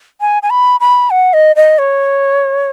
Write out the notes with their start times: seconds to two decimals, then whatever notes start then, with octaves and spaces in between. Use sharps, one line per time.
0.21 G#5
0.43 G#5
0.50 B5
0.80 B5
1.10 F#5
1.33 D#5
1.56 D#5
1.78 C#5